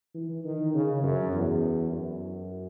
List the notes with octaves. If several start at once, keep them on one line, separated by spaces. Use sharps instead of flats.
E3
D#3
C#3
F#2
E2
F#2